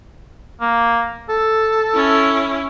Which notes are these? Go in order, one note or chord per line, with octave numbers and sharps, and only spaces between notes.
A#3
A4
C#4 E4